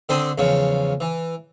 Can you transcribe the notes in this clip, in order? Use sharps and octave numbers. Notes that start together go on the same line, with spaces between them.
D3 C4 D4 C5 B5 D#6
E2 C#3 F3 C#5
E3